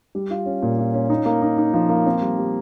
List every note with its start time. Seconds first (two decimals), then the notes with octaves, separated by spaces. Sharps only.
0.15 G3
0.30 F4
0.46 C#4
0.62 A#2
0.79 F4
0.94 C#4
1.09 D#4
1.26 A#3
1.42 D#4
1.58 D#4
1.74 F3
1.89 A#3
2.06 C4
2.21 G3
2.38 G3